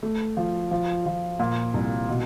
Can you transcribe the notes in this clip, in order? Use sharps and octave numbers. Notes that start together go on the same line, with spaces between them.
A3
F3
F3
F3
A#2
C2
B2